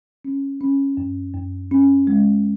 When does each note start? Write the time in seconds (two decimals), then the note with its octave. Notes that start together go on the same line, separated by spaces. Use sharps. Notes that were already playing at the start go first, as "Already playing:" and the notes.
0.25 C#4
0.61 C#4
0.97 F#2
1.35 F#2
1.71 C#4
2.07 G#3